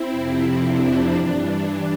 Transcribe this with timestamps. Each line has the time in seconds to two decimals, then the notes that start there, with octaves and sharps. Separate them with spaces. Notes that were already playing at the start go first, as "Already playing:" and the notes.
Already playing: C4 E4
0.10 F2 C3 F3
0.62 D4
1.13 G2 E3